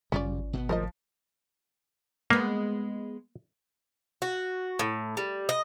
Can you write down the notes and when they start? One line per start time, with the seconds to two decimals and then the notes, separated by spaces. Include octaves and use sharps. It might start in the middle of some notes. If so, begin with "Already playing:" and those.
0.12 G#1 F#2 C#3 G3 C#4 F4 D5
0.53 B2 A#3 B3
0.69 D1 F3 A#4 C5 D#5
2.30 G#3 A#3 B3
4.22 F#4
4.79 A2
5.17 G3
5.49 D#5